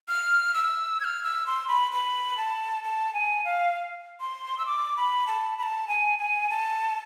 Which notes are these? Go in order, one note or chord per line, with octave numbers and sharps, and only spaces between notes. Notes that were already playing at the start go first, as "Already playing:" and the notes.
F6
E6
G#6
F6
E6
C6
B5
B5
A5
A5
G#5
F5
C6
E6
D6
B5
A5
B5
A5
G#5
G#5
A5